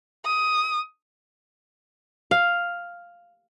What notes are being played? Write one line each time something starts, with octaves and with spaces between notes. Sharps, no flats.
D#6
F5